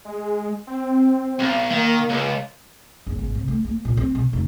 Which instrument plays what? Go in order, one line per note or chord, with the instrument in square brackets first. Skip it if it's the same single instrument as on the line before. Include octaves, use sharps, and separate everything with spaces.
[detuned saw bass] G#3
C4
[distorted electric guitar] B1
[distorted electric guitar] D#3 [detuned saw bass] A#3
[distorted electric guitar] C#2
[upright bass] F#1
G#1
C3
A3
A#3
A#2
C4
B2
F1